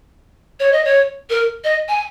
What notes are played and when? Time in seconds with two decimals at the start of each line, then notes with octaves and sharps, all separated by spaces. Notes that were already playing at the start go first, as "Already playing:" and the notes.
0.60 C#5
0.72 D#5
0.85 C#5
1.30 A#4
1.64 D#5
1.89 G#5